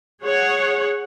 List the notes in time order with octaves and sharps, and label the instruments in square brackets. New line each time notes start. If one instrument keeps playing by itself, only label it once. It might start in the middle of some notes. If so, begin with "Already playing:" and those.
[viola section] G#4 C#5 F#5